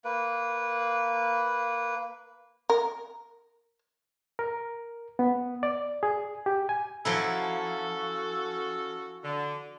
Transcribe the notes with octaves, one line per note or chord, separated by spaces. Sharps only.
A#3 B4
A#4
A#4
B3
D5
G#4
G4
G#5
F3 F#3 C#4 E4 F#4 A4
D3